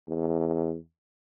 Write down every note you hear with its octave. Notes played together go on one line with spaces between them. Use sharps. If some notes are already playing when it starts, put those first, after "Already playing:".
E2